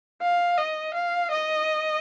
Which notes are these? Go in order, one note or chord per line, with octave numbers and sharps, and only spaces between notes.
F5
D#5
F5
D#5